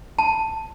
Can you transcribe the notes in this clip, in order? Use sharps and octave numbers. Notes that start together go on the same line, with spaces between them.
A5